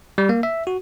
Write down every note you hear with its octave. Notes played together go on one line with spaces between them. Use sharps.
G3
A#3
E5
F#4